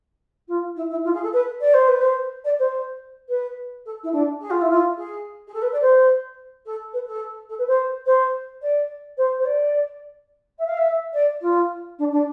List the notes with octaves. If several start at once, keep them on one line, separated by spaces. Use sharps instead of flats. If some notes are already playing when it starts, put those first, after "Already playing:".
F4
E4
E4
F4
G#4
A4
B4
D5
C5
B4
C5
D5
C5
B4
A4
E4
D4
G#4
F4
E4
F4
G#4
G#4
A4
B4
D5
C5
A4
B4
A4
A4
B4
C5
C5
D5
C5
C5
D5
E5
F5
E5
D5
F4
D4
D4